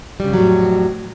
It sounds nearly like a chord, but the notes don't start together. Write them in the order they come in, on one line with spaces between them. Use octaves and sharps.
G3 C#3 F2 F#3 A2